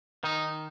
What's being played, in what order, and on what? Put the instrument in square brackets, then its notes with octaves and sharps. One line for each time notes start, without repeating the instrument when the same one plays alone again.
[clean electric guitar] D#3 [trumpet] D#4